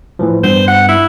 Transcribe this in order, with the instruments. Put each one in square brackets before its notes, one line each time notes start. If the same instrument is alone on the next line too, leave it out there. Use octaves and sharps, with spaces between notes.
[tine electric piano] A2 E3 F3
[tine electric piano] G2 B3 [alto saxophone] C5
[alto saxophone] F#5
E4